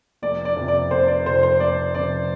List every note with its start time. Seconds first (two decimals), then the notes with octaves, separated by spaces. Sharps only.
0.22 F1 D5
0.45 D5
0.56 F2 C3
0.68 D5
0.91 F1 C5
1.08 D5
1.26 F2 C3 C5
1.43 C5
1.60 F1 D5
1.95 F2 C3 D5